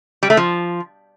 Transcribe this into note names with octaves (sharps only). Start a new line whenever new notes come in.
G3
A3
F3